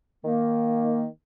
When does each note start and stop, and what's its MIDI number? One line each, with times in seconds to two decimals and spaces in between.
0.25 1.04 51
0.25 1.04 58